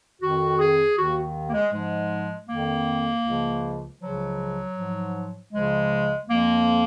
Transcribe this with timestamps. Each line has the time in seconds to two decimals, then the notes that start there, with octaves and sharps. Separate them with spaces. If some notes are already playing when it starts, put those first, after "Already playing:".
0.22 F2 D#3 F#4
0.59 G#4
0.97 D#2 D#3 F#4
1.49 A#3
1.54 G#3
1.72 G#2 F3 G#3
2.48 F2 D#3 A#3
3.24 C#2 C#3 F3
3.99 C#2 C#3 F3 F#3
4.76 G#2 F3
5.51 C#2 C#3 F3 G#3
6.27 F2 F3 A#3